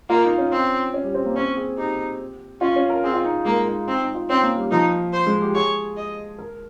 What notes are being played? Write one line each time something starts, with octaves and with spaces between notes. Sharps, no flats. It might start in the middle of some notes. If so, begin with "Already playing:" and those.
A#3 F4
D#4
C#4
C4
C#4
G3
C4
A#3
C4 C#4
G#4
D#4 G4
C#4 F4
C#4
A#4
C4 G#4
F4
D#4
G#3 A#3
D#4
C4 D#4
D#4
F4
C4 C#4
A#3
G3
F3 D#4
C5
G#3
G4
G#4 C#5
D#5
A#4